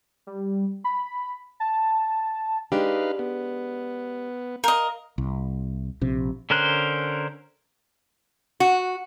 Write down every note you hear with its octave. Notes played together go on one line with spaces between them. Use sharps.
G3
B5
A5
G#3 D4 D#4 G4 B4 F5
B3
A#4 D#5 F5
C2
A#1 C3
D3 C#4 A#4 C5 F#6
F#4